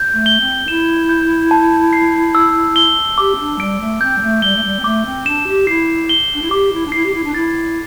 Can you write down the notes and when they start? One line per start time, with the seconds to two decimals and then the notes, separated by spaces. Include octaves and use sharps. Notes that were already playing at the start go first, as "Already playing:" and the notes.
Already playing: G6
0.12 A3
0.26 G7
0.40 C4
0.68 E4 E7
1.09 G6
1.51 A5
1.93 C7
2.35 E6
2.76 G7
3.18 G4 D6
3.34 C4
3.38 D4
3.59 G3 D7
3.80 A3
4.01 C4 G6
4.18 G3
4.22 A3
4.42 G3 G7
4.56 A3
4.63 G3
4.79 C4
4.84 A3 D6
5.05 C4
5.26 D4 E7
5.47 G4
5.67 E4 C7
6.09 G7
6.33 D4
6.42 E4
6.51 G4 D6
6.72 E4
6.86 D4
6.92 E4 C7
7.05 G4
7.14 E4
7.24 D4
7.34 E4 A6